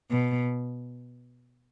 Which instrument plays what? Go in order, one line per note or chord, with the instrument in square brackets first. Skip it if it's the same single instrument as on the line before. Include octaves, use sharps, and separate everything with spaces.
[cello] B2